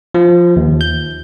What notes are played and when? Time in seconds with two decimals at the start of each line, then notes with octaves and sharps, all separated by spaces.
0.14 F3
0.57 D#2
0.81 G6